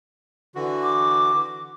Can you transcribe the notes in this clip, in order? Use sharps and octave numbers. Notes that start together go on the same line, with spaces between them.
D3 E3 F#4
D6